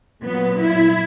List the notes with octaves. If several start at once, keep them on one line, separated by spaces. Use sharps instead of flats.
A#2 F#3 B3
E4